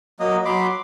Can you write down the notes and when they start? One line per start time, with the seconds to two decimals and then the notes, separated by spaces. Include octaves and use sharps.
0.20 F#3 A#3 D#5
0.45 F#3 B5 C6 D6